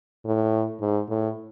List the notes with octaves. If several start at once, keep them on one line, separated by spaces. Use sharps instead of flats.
A2
G#2
A2